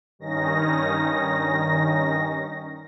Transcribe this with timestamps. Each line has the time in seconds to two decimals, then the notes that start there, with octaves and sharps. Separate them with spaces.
0.19 G2 D#3 C#4 D#4 A#6